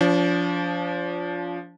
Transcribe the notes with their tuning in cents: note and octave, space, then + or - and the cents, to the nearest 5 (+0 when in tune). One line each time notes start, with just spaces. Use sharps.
F3 +0 D4 -35